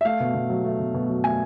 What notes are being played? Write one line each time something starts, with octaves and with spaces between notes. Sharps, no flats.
E5
A3 F5
B2
B2
F#3
A3
B2
B2
F#3
A3 G#5